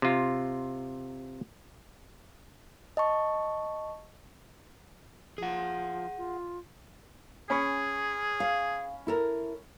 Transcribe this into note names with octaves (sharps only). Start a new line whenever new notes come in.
C3 F4
D#5 A5 C#6
F3 G#4 F#5
F4
C#4 G#4 B5 C#6
F5
E4 A4 A#4